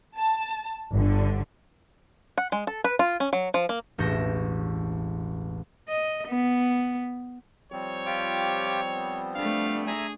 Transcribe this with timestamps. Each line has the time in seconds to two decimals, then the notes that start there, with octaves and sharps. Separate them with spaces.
0.17 A5
0.93 G1 D3
2.38 F#5
2.52 G#3
2.67 A4
2.84 B4
2.99 F4
3.20 C#4
3.33 F#3
3.54 F3
3.69 A#3
3.98 E1 A1 C#6 G6 A#6 E7
5.89 D#5
6.28 B3
7.72 F3 G3 C4 C#5
8.06 F4 G4 D6
8.93 B3
9.35 A3 D4 F5
9.87 G#4 E5 G#5 A#5